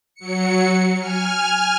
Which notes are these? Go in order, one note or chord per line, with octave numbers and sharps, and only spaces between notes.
F#3 C#7
G#5 F6